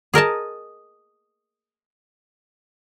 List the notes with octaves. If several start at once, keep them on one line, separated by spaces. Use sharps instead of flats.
G#4 A#4 D#5 A5